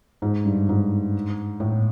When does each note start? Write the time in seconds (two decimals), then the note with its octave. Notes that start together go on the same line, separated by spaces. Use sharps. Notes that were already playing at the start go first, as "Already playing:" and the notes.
0.22 G#2
0.45 G2
0.69 G#2
1.60 A2